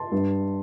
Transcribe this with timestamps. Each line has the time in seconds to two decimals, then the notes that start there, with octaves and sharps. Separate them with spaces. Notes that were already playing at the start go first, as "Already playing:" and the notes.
Already playing: A5 C6
0.12 G2